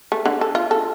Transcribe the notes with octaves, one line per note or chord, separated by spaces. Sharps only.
A3
D3
A4
F4
A4